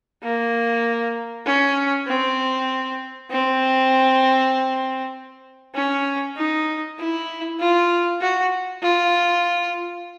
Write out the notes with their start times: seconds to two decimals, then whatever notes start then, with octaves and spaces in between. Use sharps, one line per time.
0.23 A#3
1.46 C#4
2.07 C4
3.30 C4
5.75 C#4
6.36 D#4
6.98 E4
7.59 F4
8.21 F#4
8.82 F4